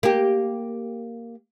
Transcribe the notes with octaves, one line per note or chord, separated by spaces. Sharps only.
A#3 G4